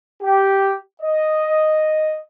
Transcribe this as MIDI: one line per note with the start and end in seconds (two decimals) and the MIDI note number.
0.22 0.74 67
1.01 2.20 75